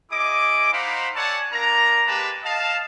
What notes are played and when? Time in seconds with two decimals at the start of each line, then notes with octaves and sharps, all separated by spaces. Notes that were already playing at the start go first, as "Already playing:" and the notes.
0.11 E4 G#4 D#5 D6
0.73 D#4 C5 F5 F#5 B5
1.15 A4 C#5 D5 F#5 G#5 A5
1.52 A#3 D4 A#4 A#5
2.07 G#3 A#3 G4 B4 A5 B5
2.44 D#5 F5 A5